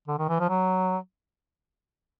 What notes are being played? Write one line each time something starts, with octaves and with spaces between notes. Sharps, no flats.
D3
D#3
E3
F3
F#3